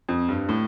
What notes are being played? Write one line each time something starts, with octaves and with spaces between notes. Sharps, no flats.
F2
G2
A2